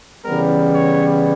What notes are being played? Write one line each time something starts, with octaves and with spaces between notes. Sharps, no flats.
C#3 E3 G3 B3 A#4
C#5